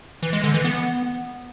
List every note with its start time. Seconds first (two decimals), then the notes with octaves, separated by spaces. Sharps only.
0.23 E3
0.33 G#3
0.44 D3
0.54 E3
0.64 B3